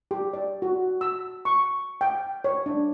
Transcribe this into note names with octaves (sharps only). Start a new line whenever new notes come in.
G4
D5
F#4
E6
C#6
G5
C#5
D4